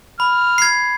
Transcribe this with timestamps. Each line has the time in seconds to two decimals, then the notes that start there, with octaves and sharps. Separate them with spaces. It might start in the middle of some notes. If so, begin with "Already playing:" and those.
0.20 B5 F6
0.58 G#6 C7